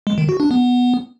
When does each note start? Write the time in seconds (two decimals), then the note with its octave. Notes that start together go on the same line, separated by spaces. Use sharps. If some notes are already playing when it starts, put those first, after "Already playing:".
0.07 G#3
0.18 D#3
0.29 F#4
0.40 D4
0.51 B3